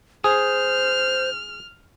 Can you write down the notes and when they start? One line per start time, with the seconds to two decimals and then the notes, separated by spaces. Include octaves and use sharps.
0.24 G#4 C5 F6